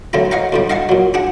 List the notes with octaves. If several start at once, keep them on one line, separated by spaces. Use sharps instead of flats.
B1 G2 D3 A3 C#4 A#5
C#5 D#5 F5 F#5 A#5
D2 A2 G3
D#5 F5 F#5 A5 C#6
A#2 F#3
D4 G#4 F#5